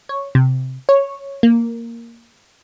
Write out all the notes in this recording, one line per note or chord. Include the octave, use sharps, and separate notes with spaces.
C#5
C3
C#5
A#3